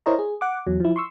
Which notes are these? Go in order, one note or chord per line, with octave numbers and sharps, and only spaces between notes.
E4 A#4 C5 C#5 D#5 A#5
G#4
F#5 D6
E2 F#3
F3 E4
C6 C#6 E6